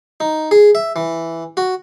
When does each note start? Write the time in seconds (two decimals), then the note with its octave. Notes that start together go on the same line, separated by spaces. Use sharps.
0.20 D#4
0.51 G#4
0.75 E5
0.96 E3
1.57 F#4